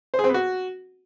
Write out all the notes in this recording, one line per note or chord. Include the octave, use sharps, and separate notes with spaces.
C5
G#4
C4
B3
F#4